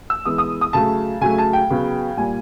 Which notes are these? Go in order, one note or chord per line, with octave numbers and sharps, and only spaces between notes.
E6
E3 G#3 B3 D#6
D#6
D#6
C#3 F#3 A3 A5
C#3 F#3 A3 G#5
A5
G5
C#3 F#3 B3
A#2 G3 A#3 G#5